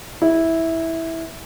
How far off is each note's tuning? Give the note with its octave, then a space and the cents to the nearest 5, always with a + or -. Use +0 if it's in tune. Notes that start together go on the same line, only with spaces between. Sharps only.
E4 -10